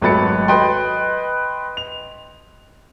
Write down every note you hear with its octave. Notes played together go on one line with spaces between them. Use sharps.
G#1 F#3 A3 B4 A6 C#7
B4 D#5 G5 C6
F7